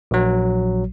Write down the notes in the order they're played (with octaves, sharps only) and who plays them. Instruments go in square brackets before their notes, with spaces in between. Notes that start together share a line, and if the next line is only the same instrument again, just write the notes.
[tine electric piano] A#1 F#3